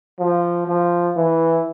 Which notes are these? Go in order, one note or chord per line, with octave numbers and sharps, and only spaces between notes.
F3
F3
E3